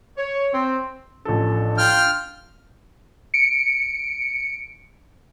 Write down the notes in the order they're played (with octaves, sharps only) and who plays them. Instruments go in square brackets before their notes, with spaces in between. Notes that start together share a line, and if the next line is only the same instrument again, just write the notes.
[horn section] C#5
C4
[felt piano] A1 F3 A4 [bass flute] D4
[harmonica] F4 G5 [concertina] F6
[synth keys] C#7 D7